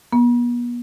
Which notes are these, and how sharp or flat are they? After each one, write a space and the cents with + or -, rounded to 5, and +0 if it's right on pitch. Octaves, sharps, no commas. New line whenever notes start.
B3 -40